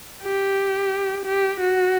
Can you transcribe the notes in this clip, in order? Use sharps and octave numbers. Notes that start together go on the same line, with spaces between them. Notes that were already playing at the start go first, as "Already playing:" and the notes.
G4
G4
F#4